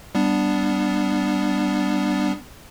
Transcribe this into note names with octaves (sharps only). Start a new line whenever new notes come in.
G3 B3 D4